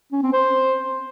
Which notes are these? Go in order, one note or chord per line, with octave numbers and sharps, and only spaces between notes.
C#4
C4
C5